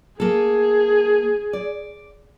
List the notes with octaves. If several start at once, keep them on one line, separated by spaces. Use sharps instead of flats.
A#3 G#4 A4
D5